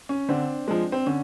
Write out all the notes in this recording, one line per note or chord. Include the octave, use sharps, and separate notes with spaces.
C#4
D3 C4 D4
F3 G#3
C4
D3 C#4